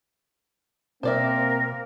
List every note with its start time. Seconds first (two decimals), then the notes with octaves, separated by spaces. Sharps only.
1.03 B2 A#3 C4 A#4 C5 D5 E5